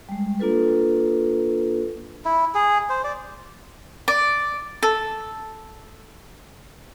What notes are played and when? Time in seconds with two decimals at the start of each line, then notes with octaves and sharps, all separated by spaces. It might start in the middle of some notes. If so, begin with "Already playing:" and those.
0.09 G3 G#3
0.39 A#3 D4 F4 A4 B4
2.25 E4
2.55 G#4
2.90 C5
3.04 D5
4.08 D5
4.83 A4